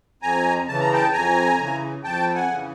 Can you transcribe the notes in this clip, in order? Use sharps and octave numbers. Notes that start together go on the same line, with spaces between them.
F2 G#5 A#5
C#3 E3 A5
A#5
G5 A5
F2 G#5 A#5
C#3 E3
F2 G5 A5
F#5 G#5
C#3 E3